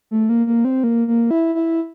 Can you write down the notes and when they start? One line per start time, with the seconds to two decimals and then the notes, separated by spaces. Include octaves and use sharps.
0.11 A3
0.29 A#3
0.47 A#3
0.65 C4
0.84 A#3
1.08 A#3
1.31 E4
1.55 E4